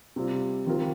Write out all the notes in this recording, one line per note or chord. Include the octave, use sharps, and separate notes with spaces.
C3 G3 C4 F4
D#3 C4 F4 A#4